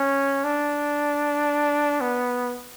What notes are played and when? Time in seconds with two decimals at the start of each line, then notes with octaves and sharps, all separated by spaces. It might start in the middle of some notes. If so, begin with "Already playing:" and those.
Already playing: C#4
0.44 D4
2.01 B3